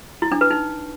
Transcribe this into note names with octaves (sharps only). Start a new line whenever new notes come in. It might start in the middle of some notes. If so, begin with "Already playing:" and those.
E4
D4
B4
D#4